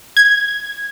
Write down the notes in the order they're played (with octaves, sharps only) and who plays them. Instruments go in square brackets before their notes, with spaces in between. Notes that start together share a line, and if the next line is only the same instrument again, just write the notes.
[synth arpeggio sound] G#6